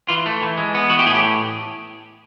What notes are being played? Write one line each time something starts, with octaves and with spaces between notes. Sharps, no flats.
E3 F4
A3
E3
G#3
B3
E3 F#4
G4
A2 G#4
G4